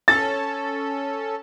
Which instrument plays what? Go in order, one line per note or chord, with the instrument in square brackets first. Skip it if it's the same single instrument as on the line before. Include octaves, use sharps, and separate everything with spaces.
[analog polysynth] C#4 A4 [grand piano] A6